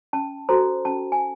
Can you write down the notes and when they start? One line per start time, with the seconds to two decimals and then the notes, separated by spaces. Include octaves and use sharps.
0.13 C#4 A5
0.49 F#4 A4 C5 A#5
0.85 C#4 A5
1.12 G#5